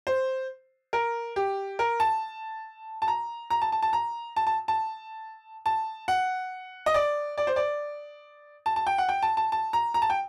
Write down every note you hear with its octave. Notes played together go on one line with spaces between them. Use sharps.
C5
A#4
G4
A#4
A5
A5
A#5
A#5
A5
A5
A5
A#5
A5
A5
A5
A5
F#5
D#5
D5
D5
C5
D5
A5
A5
G5
F#5
G5
A5
A5
A5
A#5
A#5
A5
G5